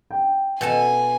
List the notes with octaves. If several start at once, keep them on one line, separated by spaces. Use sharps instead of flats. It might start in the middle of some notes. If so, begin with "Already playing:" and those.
G5
B2 A4 G#5 A5